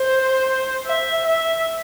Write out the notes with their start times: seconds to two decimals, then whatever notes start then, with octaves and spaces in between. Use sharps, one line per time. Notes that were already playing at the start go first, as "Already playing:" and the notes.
Already playing: C5
0.86 E5
1.26 E5